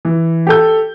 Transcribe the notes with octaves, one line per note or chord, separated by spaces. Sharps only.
E3
G4 A4 G6